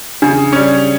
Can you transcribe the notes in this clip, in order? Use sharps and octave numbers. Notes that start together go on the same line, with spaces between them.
C#3 D4
G3 C#4